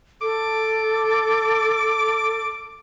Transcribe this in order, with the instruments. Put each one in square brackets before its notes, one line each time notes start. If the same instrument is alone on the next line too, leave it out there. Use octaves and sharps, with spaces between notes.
[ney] A4 [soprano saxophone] D6